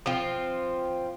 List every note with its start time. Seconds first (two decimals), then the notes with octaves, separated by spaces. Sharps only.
0.06 F3 C4 F4